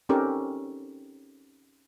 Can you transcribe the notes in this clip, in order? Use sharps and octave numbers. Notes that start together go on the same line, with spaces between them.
C4 C#4 D#4 G4 A4 A#4